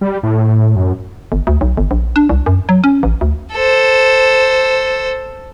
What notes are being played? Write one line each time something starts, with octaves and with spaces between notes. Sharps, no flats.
G3
A2
F#2
G1
D2
B1
G1
A#1
D4
C2
F#2
F#3
C#4
A1
D2
A4 C5